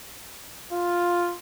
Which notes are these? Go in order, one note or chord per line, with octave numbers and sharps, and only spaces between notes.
F4